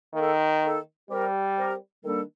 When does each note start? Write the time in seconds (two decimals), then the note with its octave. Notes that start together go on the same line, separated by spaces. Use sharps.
0.14 D#3 A#3 D#4 A4
0.62 A#3 D#4 A4
1.10 G3 C4 G4 A#4
1.58 C4 G4 A#4
2.04 D#3 G3 A#3 D4 A4